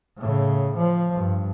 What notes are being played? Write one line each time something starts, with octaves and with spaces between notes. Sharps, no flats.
A2 C#3
F3
G2